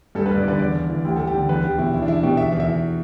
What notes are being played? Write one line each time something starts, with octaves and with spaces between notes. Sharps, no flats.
G2 A4
B4
G2
D5
D3 B4
E2 D5
E2
E3
D2 G4
D2 A4
G4
D3
E2 B4
E2 G4
B2 E4
E2 E4
D4
E2 E4
B2 G4
E2 E5
E2
E5
E3